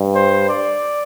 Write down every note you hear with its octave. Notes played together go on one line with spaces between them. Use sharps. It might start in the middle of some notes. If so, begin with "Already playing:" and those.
Already playing: G2
C5
D5